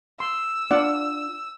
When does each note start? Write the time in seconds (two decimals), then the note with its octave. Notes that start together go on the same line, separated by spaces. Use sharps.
0.20 C6 E6
0.71 D4 F4 D5 F#5 D6